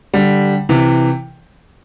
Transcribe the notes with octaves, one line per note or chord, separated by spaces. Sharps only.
D3 G3
C3 E3